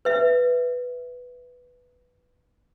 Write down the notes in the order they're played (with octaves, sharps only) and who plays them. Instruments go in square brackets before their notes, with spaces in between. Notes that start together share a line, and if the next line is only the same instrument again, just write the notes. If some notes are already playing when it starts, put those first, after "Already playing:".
[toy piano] B4 E5